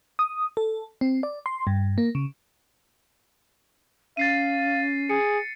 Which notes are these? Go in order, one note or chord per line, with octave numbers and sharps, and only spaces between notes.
D#6
A4
C4
D5
C6
G2
A#3
C#3
C#4 F5 A6 C7 D#7
G#4 C#7